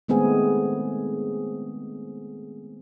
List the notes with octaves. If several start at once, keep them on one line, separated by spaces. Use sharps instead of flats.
D#3 G#3 A3 B3 C4 G#4